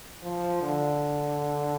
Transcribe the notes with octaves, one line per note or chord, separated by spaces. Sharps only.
F3
D3